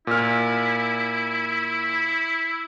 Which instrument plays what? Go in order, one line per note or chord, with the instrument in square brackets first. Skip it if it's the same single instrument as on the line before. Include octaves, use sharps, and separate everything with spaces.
[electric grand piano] A#2 F6 [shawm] E4